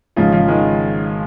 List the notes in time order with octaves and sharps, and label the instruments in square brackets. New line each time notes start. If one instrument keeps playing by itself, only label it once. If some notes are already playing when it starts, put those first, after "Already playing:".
[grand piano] G#1 G#2 G#3 D#4 [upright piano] C#3 F3
[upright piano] C#3 F3
D#3 G#3